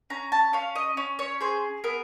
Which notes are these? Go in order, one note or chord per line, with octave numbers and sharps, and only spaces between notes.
C#4 A#5
A5
C#4 F5
D#5
C#4
C#5
G#4 C5
B3 A#4